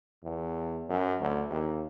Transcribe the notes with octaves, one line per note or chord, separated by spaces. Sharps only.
E2
F#2
D2
D#2